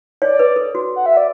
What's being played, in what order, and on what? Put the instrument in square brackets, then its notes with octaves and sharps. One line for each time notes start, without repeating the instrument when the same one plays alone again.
[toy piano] C#5 [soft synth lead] D5
[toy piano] B4
A4
F#4
[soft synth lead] F#5
E5
D5